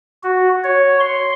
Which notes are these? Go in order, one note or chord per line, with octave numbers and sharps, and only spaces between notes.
F#4
C#5
C6